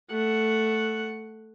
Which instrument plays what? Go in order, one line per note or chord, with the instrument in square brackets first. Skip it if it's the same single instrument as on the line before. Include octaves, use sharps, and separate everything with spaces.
[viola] A3 F#5